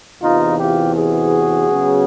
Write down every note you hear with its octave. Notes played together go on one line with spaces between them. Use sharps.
E2 C3 E3 D#4 F4
F4 G4
F#4 G#4
C#3 F#3 B3